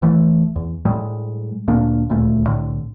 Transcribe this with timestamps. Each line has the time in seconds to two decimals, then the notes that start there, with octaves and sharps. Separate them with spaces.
0.02 E1 E3 A3
0.56 E2
0.85 A2 G3 G#3
1.68 D2 A#2 A#3 D4
2.09 D#1 D2 A#2 A3
2.44 C2 A2 D3